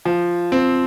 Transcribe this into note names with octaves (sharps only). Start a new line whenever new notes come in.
F3
C4